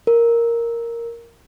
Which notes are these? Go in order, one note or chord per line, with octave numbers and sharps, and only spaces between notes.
A#4